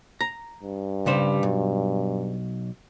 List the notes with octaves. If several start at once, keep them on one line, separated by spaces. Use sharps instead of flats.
A#5
G2
C#3 G3 C5
B1